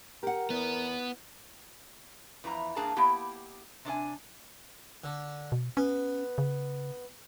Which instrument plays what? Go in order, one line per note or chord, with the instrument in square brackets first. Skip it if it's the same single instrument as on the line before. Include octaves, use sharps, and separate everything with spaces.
[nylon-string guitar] G4 F#5 [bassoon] A#4
[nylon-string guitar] E2 [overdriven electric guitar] B3
[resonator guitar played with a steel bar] E2 E3 F3 A#5
G2 A#3 D4 G#4 A5 A#5
A#3 B3 E4 G4
C3 D4 D5 G#5
[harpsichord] D3
[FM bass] B2
[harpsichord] B3 [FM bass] C#4
[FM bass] C#3